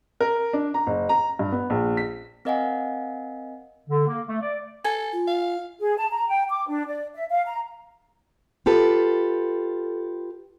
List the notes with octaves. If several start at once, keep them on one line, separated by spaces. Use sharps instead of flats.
A#4
D4
A#5
F#1
A#5
G2
B3
A#1
B6
C4 A#4 D#5 F5 F#5 G#5
D3
A#3
A3
D5
A4 G#5
F4
F5
G#4
A5
A#5
G5
D6
D4
D5
E5
F5
A#5
F4 G4 A4 B4